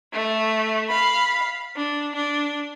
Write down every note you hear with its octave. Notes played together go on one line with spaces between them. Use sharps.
A3
F5 B5
D4
D4